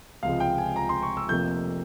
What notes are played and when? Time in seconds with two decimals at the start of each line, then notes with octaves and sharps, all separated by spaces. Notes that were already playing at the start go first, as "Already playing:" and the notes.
0.23 C#2 C3 F3 G#3 F5
0.40 G5
0.58 G#5
0.76 A#5
0.89 C6
1.03 C#6
1.17 E6
1.29 F1 F2 C3 F3 A#3 G6